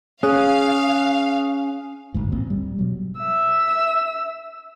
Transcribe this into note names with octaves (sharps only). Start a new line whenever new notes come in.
C#4 G#4 F5 D#6 F#6
G1 D2 G#2
A1 A#2 C4
G3
B2 F#3
E5 E6